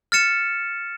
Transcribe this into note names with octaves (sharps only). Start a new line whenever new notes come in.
F6 A6 C#7 E7